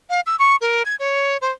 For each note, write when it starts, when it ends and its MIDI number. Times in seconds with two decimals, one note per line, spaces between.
0.10 0.20 77
0.26 0.36 88
0.39 0.56 85
0.61 0.83 70
0.85 0.96 92
1.00 1.37 73
1.41 1.51 72